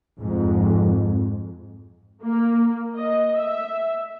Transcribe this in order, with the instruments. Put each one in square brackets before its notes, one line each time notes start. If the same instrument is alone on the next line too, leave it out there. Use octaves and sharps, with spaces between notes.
[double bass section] F2 G#2
[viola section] A#3
D#5
E5